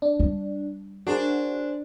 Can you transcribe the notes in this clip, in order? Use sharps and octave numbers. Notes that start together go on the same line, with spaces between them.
D4
G3
D4 F#4 G#4 A#4 C5